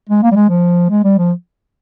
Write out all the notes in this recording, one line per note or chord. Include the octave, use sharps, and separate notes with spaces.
G#3
A#3
G3
G#3
F3
G#3
G3
F3